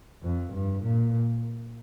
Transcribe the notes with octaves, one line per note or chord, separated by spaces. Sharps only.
F2
G2
A#2